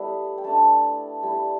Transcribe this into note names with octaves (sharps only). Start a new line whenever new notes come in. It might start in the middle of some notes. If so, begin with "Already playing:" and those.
Already playing: G3 A3 B3 E4 A5
G5
A3 D4 A5
G3 E4